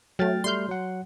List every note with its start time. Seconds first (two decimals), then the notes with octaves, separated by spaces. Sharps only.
0.19 F#3 A3 G5 F6 A6
0.44 G3 A3 C6 F6 G6
0.69 F#3 F#5